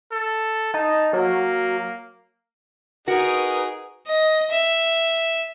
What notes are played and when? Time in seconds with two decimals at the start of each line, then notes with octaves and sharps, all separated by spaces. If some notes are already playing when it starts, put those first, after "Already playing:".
0.12 A4
0.74 D#4 A5
1.13 F#3 A#3
3.08 D#4 F#4 G#4 A#4 B4
4.07 D#5
4.51 E5